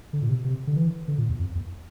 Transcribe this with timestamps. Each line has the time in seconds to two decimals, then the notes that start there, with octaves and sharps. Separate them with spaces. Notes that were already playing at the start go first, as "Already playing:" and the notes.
0.13 D3
0.22 A#2
0.29 C3
0.45 C3
0.67 D3
0.76 E3
1.08 D3
1.18 A#2
1.29 E2
1.39 F2
1.55 E2